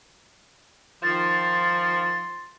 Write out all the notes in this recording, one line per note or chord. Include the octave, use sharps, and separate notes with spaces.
D#3 F3 C6 A6